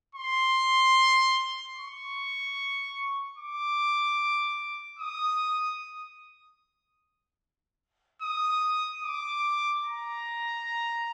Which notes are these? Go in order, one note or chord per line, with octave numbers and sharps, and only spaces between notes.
C6
C#6
D6
D#6
D#6
D6
A#5